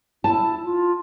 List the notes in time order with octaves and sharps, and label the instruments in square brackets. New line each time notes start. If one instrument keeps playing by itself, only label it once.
[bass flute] E4 [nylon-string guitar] A5
[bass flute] F4